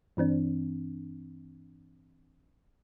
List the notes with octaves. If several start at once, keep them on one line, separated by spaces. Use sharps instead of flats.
G2 E3 C4 D4